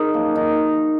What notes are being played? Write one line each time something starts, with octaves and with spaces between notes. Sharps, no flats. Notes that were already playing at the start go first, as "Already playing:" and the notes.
Already playing: D#4 G#4 A#4
F#2 F3 A#3
D#4